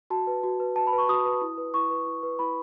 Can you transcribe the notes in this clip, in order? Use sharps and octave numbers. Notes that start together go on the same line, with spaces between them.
F#4 A5
B4
F#4
B4
F#4 A5
B5
B4
C#6
F#4 D#6
B4
E4
B4
E4 C#6
B4
E4
B4
E4 B5